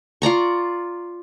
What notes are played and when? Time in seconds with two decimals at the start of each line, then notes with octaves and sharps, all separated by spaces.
0.22 F4 D5 A#5 C#6